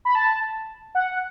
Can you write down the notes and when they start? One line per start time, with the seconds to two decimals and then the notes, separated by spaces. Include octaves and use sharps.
0.05 B5
0.15 A5
0.95 F#5